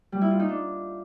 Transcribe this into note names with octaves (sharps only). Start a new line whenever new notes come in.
G3
E4
F4
D#4
D4